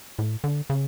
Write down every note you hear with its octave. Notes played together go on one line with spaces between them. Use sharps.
A2
D3
C#3